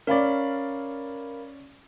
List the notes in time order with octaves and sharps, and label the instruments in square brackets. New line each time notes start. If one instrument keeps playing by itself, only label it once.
[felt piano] C#4 D5 [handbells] A#4 F5 B5